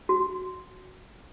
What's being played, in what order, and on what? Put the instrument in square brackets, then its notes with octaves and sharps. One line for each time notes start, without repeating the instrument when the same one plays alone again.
[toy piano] F#4